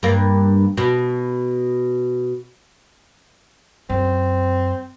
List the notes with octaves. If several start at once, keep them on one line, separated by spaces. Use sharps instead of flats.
G2 A#3
B2
F#2 C4